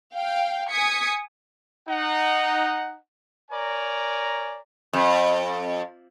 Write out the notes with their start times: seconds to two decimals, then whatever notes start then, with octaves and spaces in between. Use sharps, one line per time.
0.13 F5 G5
0.69 G#5 D#6 G#6 B6 C#7
1.89 D#4 F#5
3.51 A#4 C#5 D5 G#5 A#5
4.93 F2